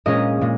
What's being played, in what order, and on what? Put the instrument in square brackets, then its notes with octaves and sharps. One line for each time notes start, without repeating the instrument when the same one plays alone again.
[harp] A#2 G#3 C#4 D#5
A#2 G#3